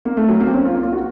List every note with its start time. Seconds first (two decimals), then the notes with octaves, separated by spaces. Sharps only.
0.05 A#3
0.17 A3
0.28 F#3
0.40 A#3
0.47 C4
0.53 C#4
0.65 F4
0.74 A#3
0.83 F4
0.92 F#4